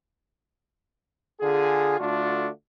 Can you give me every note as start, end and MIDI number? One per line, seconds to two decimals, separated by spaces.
1.41 1.98 50
1.41 1.98 65
1.41 1.98 68
1.99 2.49 50
1.99 2.49 57
1.99 2.49 62
1.99 2.49 65
1.99 2.49 66